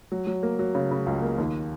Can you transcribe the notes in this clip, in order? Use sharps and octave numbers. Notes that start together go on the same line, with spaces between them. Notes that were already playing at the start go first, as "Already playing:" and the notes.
F#3
F#3
A#3
F#3
C#3
C#3
C#2
A#3
D#2